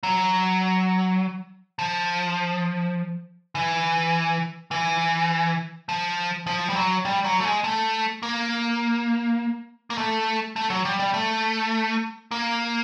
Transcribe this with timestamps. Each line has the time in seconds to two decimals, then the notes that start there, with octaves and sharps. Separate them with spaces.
0.03 F#3
1.79 F3
3.55 E3
4.71 E3
5.89 F3
6.47 F3
6.70 G3
6.76 F#3
7.05 G3
7.24 F#3
7.40 A3
7.45 G#3
7.64 A3
8.23 A#3
9.90 A#3
9.98 A3
10.56 A3
10.70 F#3
10.85 G3
10.99 G3
11.14 A3
12.31 A#3